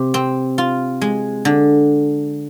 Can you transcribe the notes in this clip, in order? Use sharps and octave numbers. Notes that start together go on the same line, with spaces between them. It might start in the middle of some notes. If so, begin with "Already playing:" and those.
Already playing: C3
C4
F4
G#3
D3